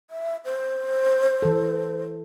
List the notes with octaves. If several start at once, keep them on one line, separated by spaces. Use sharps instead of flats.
E5
C5
E3 A4